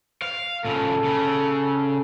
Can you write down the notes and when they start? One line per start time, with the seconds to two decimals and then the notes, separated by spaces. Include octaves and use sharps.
0.22 F5
0.65 A#2 C#3 A4
1.04 C#3